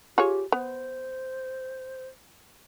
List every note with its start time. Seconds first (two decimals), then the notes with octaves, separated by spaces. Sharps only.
0.18 F4 G4 G#4 C#5
0.52 B3 C5